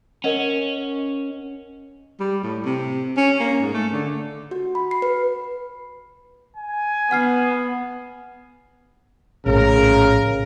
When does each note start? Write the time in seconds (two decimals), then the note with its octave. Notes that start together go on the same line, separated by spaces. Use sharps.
0.24 C#4 A#4 D#5 F#5
2.20 G3
2.43 A2
2.65 C3
3.17 C#4
3.40 A#3
3.61 G#2
3.73 A3
3.93 D3
4.51 F#4
4.75 B5
4.91 C7
5.02 B4
6.56 G#5
7.11 B3 F#5 F6 C7
9.46 A#1 A2 C#3 A#4